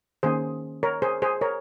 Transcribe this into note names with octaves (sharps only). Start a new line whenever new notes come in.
D#3 A#3 C#4 G#4 C5
A#4 C#5
G#4 C5
G#4 C5
A#4 C#5